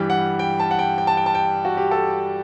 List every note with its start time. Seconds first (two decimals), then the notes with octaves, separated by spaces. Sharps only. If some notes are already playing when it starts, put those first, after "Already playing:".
Already playing: G2 E3 G3 G5
0.10 F#5
0.39 G5
0.60 A5
0.71 F#5
0.79 G5
0.98 G5
1.07 A5
1.17 G5
1.26 A5
1.35 G5
1.65 F#4
1.77 G4
1.91 A4